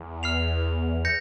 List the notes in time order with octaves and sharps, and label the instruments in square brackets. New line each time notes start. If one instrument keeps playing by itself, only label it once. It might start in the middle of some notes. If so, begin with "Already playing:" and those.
Already playing: [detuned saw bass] E2
[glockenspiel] F6 C7 F7
G6 A#6 C#7